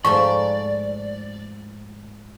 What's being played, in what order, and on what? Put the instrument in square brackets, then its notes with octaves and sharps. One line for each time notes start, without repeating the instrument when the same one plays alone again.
[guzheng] G#2 F3 A3 [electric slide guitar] D5 [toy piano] C#6